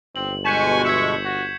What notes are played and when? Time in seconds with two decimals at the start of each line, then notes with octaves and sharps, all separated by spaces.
0.16 G1 C4 F#7
0.45 B2 G#3 G#5 C#6 G6 B6 E7
0.85 E5 G#6 C#7 E7
1.25 F#4